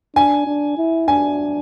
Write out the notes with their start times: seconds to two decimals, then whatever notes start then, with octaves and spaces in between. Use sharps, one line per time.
0.15 D4 G#5
0.47 D4
0.77 E4
1.08 D4 G#5